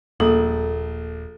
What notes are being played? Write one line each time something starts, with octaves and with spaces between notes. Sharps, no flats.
D#1 A#1 A3 A#3 A4 D#6